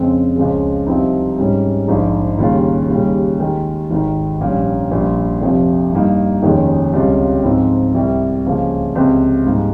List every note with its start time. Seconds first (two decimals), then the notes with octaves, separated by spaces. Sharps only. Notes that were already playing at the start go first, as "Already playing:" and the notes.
Already playing: F2 C#3 G#3 C4
0.36 C#2 C#3 F3 G#3
0.87 C2 C3 F3 C4 D#4
1.37 G#2 G3 C#4
1.88 A#1 G#2 F3 G#3 D#4
2.38 D#2 C#3 G3 A#3 F4
2.89 D#2 C#3 G3
3.39 D#2 D#3 G#3
3.90 G#1 G#2 D#3
4.40 A#1 A#2 G3 A#3 C#4
4.91 A#1 A#2 G3 A#3 F4
5.42 F1 F2 C3 F3
5.92 G2 G3 A#3 D#4
6.43 F1 D#2 D#3 G#3 C#4
6.93 C#2 C3 G3 C#4 F4
7.44 G#2 F3 C4
7.95 C2 C3 G3
8.45 C#2 C#3 F3 A#3
8.95 C#2 C3 F3 C4
9.45 G#2 G3 A#3